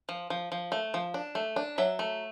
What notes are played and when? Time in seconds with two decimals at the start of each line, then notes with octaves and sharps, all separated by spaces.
0.09 F3
0.30 F3
0.52 F3
0.72 A3
0.94 F3
1.14 D4
1.35 A3
1.56 D4
1.78 F#3 E5
1.99 A3